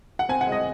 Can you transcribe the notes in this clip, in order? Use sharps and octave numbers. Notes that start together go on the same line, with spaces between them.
F#5
C4 G#5
F#5
G#3
D#5